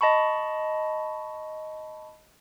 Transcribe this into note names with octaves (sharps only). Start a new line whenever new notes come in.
D#5 A5 B5 C#6